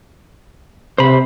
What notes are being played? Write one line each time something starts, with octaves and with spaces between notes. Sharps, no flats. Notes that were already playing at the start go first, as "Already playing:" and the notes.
C3 C5 B5